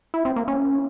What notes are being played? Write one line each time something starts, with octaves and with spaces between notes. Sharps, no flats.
E4
C4
A#3
C#4